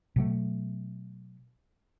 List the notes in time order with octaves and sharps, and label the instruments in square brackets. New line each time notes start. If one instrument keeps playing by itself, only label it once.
[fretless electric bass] B2 F#3 A3